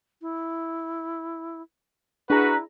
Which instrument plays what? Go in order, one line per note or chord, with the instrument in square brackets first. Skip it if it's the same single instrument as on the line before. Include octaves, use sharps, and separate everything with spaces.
[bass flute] E4
[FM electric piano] D4 G#4 A#5 [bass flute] E4 [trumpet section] F#4 B4